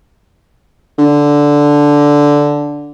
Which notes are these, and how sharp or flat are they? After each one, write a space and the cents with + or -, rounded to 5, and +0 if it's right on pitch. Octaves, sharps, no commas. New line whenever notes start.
D3 -5